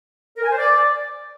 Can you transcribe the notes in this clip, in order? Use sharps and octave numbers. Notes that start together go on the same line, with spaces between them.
A#4
G#5
C5
D5